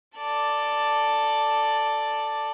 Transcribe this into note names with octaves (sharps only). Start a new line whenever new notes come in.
A4 D5